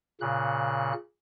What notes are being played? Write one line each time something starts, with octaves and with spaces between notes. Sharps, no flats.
A#2 C#3 F#6